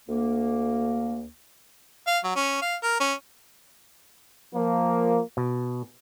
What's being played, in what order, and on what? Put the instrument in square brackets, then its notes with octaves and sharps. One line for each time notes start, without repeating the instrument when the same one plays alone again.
[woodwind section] D2 A#3
[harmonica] F5
F#3
C#4
F5
A#4
C#4
[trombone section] F3 A#3
[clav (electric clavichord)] B2